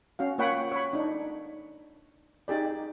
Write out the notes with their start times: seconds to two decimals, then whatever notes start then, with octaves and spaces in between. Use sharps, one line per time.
0.19 C#4 F#4 F5
0.38 A#3 F4 C#5 F#5 G5 B5
0.72 C#5 B5
0.93 D4 D#4
2.48 D#4 G4 G#4 D5